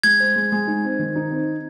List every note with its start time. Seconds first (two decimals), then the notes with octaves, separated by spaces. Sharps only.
0.04 G#3 G#6
0.20 C5
0.36 G#3
0.52 G#3
0.67 D#4
0.84 C4
0.99 D#3
1.16 D#4
1.31 C4